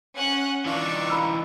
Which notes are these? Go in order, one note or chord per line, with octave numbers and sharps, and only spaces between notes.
C#4 F#5 F#6
E3 D4 D#4 F4 C#6
E4 B5 E6